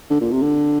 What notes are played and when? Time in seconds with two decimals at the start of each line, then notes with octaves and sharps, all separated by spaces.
0.10 D3
0.21 A#2
0.32 C3
0.42 D3